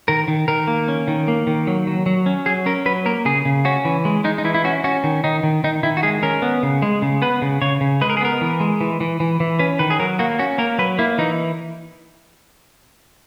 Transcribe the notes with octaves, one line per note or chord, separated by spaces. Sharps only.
D#3 A#4
D#3
D#3 A#4
A#3
C#4
D#3
A#3
D#3
F#3
F#3
F#3
C#4
F#3 G#4
C#4 A#4
F#3 B4
A#3 A#4
C#3 G#4
C#3
C#4 F#4
E3
G#3
G#3 D#4
D#4
E3 E4
E4
C#4 F#4
C#4 F#4
D#3
D#3 D#4
D#3
D#3 D#4
D#3 E4
F#4
G#3 G#4
C#4 A#4
B3
C#3
G#3
C#3
B3 B4
C#3
C#3 C#5
C#3
G#3 B4
A#4
G#4
B3 A#4
E3
G#3
E3
E3
E3
E3
C#4 B4
D#3 B4
G#4
F#3 A#4
A#3 F#4
C#4 F#4
A#3 A#4
F#3 B4
A#3 E4
E3 D#4